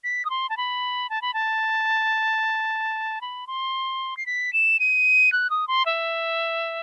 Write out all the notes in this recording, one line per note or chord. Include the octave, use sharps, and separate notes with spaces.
B6
D#6
C6
A5
B5
A5
B5
A5
B5
C6
C7
B6
E7
D#7
F#6
D#6
C6
E5